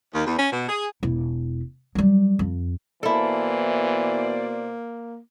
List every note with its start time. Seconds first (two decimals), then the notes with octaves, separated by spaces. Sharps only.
0.14 D#2
0.26 E2
0.38 C#4
0.52 B2
0.69 G#4
1.03 E1 E4
1.95 F#3 G3
2.39 F2
3.03 B2 E3 A#3 E4 A4 C5 D5